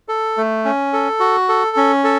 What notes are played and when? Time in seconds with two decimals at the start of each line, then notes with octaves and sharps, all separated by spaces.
0.09 A4
0.37 A3
0.65 C#4
0.93 A4
1.20 F#4
1.49 A4
1.77 C#4
2.04 A4